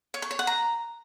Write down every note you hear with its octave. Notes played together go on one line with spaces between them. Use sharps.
C#5
C#6
C#5
F#5
A#5